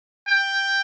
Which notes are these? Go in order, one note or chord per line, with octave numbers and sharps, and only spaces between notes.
G5